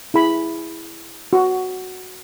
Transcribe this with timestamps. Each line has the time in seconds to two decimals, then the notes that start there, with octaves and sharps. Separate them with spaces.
0.14 E4 G#4 B5
1.33 F#4